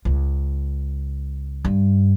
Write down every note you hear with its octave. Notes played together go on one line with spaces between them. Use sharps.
C#2
G2